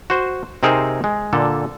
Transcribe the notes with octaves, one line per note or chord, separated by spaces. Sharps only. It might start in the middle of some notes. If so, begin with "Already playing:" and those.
F#4 C5
C3 C4 D#4 G#4 A#4 C5
G#3
A#2 D3 A4